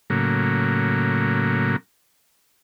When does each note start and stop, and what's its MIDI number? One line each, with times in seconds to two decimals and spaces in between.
0.10 1.76 45
0.10 1.76 49
0.10 1.76 54
0.10 1.76 58